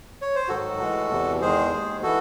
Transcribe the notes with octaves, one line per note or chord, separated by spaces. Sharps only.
C#5
C5
G#2 D#3 F#3 F#4 A4
A2 E3 G#3
E2 C3 E3
E2 D#3 G#3 G#4 C5
D#2 D#3 G#3
E3 F#4 A4